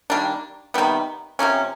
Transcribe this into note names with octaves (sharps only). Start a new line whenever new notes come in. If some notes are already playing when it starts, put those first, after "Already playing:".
D#3 G3 A#3 D4
C3 D#3 G3 B3
C3 F3 A#3 C#4